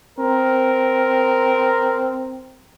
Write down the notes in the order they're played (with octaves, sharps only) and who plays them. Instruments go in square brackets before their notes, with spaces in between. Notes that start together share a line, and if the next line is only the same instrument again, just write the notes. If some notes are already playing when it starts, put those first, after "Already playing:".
[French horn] C4 [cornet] A#4